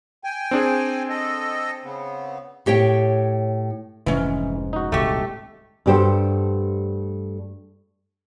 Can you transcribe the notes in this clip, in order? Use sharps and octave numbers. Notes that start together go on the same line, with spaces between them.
G5 G#5
C4 D4 G#4
A4 D#5
C#3 B3
A2 G4 C#5 G5
F1 G#2 E3 C#4
D#4 F#4
D#1 C2 C3 A3 G4
G2 A3 G4 A4 C5 F#5